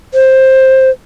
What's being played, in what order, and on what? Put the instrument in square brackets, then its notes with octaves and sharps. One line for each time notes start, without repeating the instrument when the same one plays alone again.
[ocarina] C5